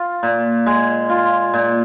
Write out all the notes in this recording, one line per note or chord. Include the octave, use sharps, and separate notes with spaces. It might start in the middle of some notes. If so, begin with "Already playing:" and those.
Already playing: F4
A#2
G#3
F4
A#2